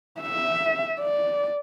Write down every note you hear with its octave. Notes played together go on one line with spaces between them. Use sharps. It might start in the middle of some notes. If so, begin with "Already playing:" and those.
E5
D5